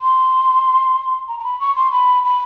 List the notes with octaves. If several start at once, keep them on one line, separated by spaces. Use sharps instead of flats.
C6
A#5
A#5
B5
C#6
C6
B5
B5